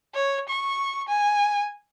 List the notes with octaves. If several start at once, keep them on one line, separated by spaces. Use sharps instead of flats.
C#5
C#6
G#5